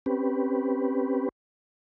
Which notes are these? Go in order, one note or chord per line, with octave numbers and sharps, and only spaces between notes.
C4 C#4 G4 B4